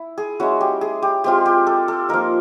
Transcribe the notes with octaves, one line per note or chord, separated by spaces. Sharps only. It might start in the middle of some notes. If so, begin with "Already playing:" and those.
Already playing: E4
G#4
G#3 C#4 E4 F#4
G4
G#4
G4
G#3 C4 F4 G4
G4
A4
A4
F3 A#3 D#4 A#4